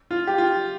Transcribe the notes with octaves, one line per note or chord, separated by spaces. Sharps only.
F4
G4
F4